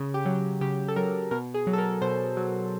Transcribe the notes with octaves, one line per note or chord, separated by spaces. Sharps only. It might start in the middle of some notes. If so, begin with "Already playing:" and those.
Already playing: C#3
G4
F#3
C#3 G4
A4
F#3 A#4
B2 A#4
G#4
F#3
A4
A#4
B2 C5
F#3